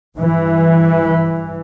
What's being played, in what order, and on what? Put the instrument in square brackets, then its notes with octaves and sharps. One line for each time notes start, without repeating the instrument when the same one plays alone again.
[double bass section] G2 E3